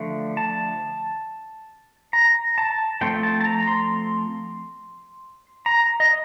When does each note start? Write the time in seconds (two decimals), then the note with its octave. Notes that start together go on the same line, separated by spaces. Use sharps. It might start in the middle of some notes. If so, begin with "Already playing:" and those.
Already playing: D3 F3 A3
0.37 A5
2.13 A#5
2.58 A5
3.01 F3 A3 C4 G5
3.23 A5
3.41 A5
3.46 A#5
3.67 C6
5.66 A#5
6.00 D#5